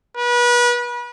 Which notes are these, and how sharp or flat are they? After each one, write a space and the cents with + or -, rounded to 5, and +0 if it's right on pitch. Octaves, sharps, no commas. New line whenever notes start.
B4 -30